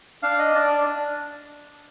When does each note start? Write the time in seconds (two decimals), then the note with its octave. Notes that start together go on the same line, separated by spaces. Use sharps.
0.23 D4 F5
0.39 D#5
0.55 D4 D5